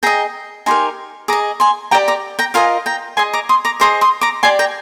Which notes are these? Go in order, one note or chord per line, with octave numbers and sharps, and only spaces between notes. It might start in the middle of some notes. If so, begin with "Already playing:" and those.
G#4 D#5 G5 A#5
D#4 G4 A#4 G#5 C6
G#4 D#5 A#5 D6
G#5 C6
G4 D5 G5 A#5
A#5 D6
G5 A#5
F4 A#4 D#5 F5 G#5
G5 A#5
G#4 D#5 G#5 C6
A#5 D6
C6 D#6
A#5 D6
G#4 C5 D#5 A#5 D6
C6 D#6
A#5 D6
G4 D5 G#5 C6
G5 A#5